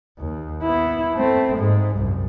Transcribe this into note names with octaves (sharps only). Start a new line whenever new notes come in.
D#2
B3 E4
A3 C4
G#2 G#3
C2 F#2